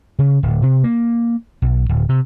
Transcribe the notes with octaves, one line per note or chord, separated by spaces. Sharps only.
C#3
D1
C3
A#3
B1
D1
C3